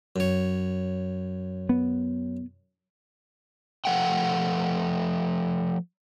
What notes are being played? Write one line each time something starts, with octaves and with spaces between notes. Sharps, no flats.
F#2 C#5
B3
F3 A3 F#5 G5